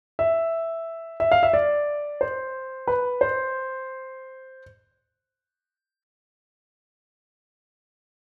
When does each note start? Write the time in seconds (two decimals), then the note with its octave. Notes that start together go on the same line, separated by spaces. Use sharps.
0.19 E5
1.20 E5
1.32 F5
1.43 E5
1.53 D5
2.21 C5
2.88 B4
3.21 C5